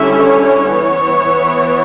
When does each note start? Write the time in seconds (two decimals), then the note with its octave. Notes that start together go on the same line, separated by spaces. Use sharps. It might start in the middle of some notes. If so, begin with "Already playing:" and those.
Already playing: D3 G3 C#4 E4 E5
0.26 C#5
0.72 E3 B3 E4